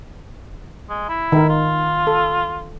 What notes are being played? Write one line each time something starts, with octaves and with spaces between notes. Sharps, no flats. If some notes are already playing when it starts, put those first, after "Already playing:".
G#3
E4
D#3 A#4
F4
A4